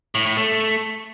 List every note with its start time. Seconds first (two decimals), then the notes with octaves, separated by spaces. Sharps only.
0.15 A2
0.26 A2
0.37 A3